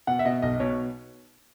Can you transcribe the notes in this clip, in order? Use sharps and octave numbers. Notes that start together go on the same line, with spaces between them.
B2 F#5
E5
B2 D#5
B1 D#5
B2 C#5